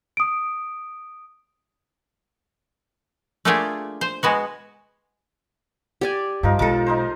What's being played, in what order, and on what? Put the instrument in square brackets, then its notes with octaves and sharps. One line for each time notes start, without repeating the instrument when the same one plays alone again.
[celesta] D#6 D7
[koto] A3 A#3 D4 F4 G4 G#4
C5
G#3 B3 F#4
[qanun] G4 D5 G#5
[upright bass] G2 [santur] F3 D#4 A#4
[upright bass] B1 G#3 [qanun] A4 D6 [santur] A#4 D#5 A5
[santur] D#4 A#4 C5